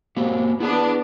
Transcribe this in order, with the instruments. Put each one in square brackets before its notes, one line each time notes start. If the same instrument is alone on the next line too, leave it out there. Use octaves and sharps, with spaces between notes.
[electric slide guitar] A#3 F#4 G4
[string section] B3 D4 [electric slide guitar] E4 G#4